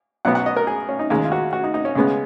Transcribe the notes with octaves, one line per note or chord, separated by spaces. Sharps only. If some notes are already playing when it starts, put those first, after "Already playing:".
B1 B2 F#3 B3 F#5
F#5
D#5
A#4
G#4
C#4
D#4
D#2 C#3 G#3
F4
F#4
F#4
D#4
D#4
C#4
C#2 C#3 G#3 B3